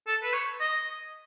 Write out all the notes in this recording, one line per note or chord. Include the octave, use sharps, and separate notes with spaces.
A4
B4
C#5
D#5